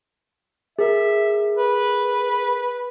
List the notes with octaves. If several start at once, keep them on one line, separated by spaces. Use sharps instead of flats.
G#4 A#4 E5
B4